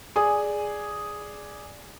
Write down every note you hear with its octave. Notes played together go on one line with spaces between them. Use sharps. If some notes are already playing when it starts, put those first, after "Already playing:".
G#4 D5 G#5 D#6